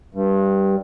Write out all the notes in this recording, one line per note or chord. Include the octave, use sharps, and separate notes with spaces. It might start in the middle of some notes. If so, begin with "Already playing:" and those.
G2